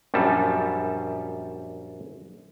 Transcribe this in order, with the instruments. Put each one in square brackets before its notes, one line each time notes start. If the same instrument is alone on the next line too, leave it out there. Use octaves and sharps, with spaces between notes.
[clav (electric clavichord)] A#1 F#2 G3 A5